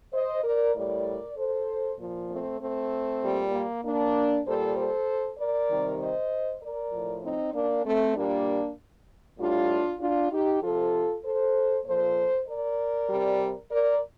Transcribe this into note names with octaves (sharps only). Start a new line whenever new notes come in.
C5 D#5
A#4 D5
A2 G3 A#4 D5
A4 C5
A#2 F3
A3 C4
A3 C4
A#2 G3
A#3
A#3 D4
A#2 G3 A4 C5
A4 C5
A#4 D5
C3 D#3 G3
C5 D#5
A#4 D5
A2 F3
C4 D#4
A#3 D4
A3 C4
A#2 G3 A#3 D4
A2 G3 D4 F4
D4 F4
D#4 G4
C3 F3 F4 A4
A4 C5
A#2 F3 A4 C5
A#4 D5
C3 G3
A#4 D5